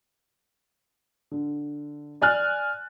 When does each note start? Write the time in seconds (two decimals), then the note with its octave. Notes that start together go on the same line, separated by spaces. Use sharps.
1.31 D3
2.22 D5 G#5 F6 F#6 A6